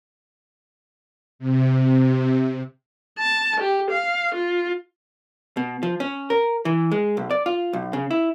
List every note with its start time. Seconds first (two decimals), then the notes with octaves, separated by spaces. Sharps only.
1.39 C3
3.19 A5
3.61 G4
3.91 F5
4.35 F4
5.57 B2
5.83 F3
6.00 C#4
6.30 A#4
6.65 E3
6.91 G#3
7.17 B1
7.31 D5
7.46 F4
7.73 B1
7.93 C#3
8.11 E4